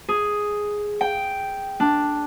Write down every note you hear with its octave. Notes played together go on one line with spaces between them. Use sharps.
G#4
G5
D4